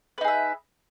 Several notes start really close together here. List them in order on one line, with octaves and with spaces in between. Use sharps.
B4 D#4 G#4 E5